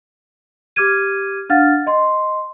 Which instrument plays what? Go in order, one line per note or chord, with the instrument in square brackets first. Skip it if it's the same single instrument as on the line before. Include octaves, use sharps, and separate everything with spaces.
[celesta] G4 D6 F6 G#6 D#7
D4 F5 F#5 F6 A6
D#5 C6